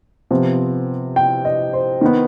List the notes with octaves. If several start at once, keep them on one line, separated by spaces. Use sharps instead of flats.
C3 F3 B3
G5
D#5
C5
D#3 B3